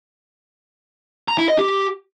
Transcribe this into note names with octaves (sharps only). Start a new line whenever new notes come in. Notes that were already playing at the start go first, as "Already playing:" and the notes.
A#5
E4
D#5
G4